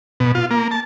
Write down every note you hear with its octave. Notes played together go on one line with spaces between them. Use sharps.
B2
F4
A#3
A5